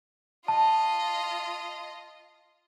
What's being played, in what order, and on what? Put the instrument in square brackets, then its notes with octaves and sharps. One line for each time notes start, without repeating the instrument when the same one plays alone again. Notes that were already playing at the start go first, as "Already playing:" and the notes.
[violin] F4 D#5 [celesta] A5